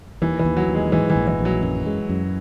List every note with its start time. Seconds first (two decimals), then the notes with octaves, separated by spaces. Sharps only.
0.22 D#2 E3
0.39 E3
0.45 D#2
0.57 F#3
0.68 D#2
0.75 G#3
0.92 G#2 E3
1.10 E3
1.16 A#1
1.27 E3
1.39 A#1
1.45 F#3
1.63 F#2
1.86 G#3
2.09 F#2